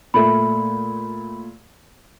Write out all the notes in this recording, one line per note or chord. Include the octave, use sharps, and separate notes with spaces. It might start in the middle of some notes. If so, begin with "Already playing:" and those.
A#2 A3 B5